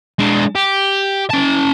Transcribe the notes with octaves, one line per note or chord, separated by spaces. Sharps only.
G#3 D4
G4
C#4 A5